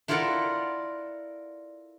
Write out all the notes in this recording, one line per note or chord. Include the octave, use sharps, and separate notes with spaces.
E4 F4 A4 A#4 D5 F#5